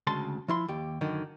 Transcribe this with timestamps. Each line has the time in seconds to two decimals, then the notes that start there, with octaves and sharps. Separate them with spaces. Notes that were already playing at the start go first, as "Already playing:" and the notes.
0.07 D2 C#3 G#3 A5 C6
0.48 F3 E4 C6
0.68 D#2 G4
1.01 F#2 D3 D#3